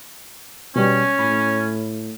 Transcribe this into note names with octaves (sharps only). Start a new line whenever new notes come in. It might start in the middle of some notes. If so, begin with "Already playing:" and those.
B2 G3 C#4
A2 B5